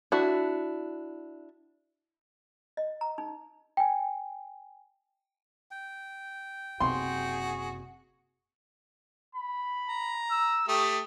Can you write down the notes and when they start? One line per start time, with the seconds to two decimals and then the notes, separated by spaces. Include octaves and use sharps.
0.12 D4 E4 F#4
2.77 D#5
3.01 A#5
3.18 D#4
3.77 G5 G#5
5.71 G5
6.80 F#1 C3 F#4 G#4 C6
9.35 B5
9.89 A#5
10.31 E6
10.68 A3 G4 D#6